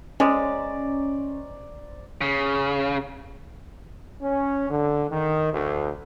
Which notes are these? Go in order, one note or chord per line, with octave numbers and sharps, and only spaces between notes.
G#3 C#4 C5 D5 A#5
C#3
C#4
D3
D#3
D2